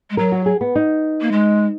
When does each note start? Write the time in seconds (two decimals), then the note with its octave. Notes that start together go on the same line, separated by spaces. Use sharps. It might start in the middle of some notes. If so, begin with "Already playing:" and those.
0.10 G#3
0.17 F#3 A#4
0.32 F#4
0.46 G#4
0.61 B3
0.75 D#4
1.21 A#3
1.32 G#3